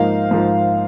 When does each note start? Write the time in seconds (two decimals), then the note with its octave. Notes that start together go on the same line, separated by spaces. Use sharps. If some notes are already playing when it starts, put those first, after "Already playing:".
Already playing: G#2 F3 A#3 D#4 F5
0.31 G#2 F3 A#3 D#4